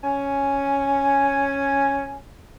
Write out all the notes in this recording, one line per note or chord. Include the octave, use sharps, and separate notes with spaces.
C#4 G#5